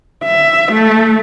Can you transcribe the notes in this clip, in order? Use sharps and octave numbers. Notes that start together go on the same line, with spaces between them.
E5
A3